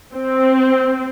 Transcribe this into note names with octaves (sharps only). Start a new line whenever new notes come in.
C4